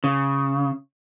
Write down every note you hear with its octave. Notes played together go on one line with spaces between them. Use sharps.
C#3